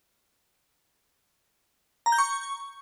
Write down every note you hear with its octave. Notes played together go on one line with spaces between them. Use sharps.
A#5
G6
C#6